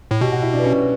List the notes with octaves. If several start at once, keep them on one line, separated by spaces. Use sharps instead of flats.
A2
B2 G4
F#4
E4
D4
B3
C#4